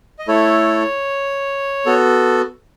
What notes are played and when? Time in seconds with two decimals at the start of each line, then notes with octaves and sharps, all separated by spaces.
0.19 D#5
0.28 A3 E4 A4 C#5
1.86 B3 F#4 A4